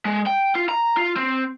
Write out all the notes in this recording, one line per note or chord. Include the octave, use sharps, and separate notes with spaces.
G#3
G5
F4
A#5
F4
C4